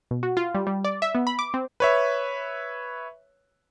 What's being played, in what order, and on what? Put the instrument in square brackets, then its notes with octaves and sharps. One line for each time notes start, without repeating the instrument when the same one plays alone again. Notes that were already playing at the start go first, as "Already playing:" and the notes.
[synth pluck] B2
F#4
F4
G3
G3
D5
E5
B3
B5
D6
C4
[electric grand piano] B4 C#5 E5